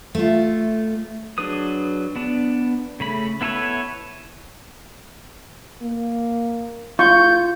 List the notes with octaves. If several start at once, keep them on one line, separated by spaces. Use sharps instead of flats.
A3 F4
F#3 D4 G#4 B4 D#6
B3 D4
C#3 A3 B5
B3 E4 A4 B4 C#5
A#3
F#1 F4 C#6 G6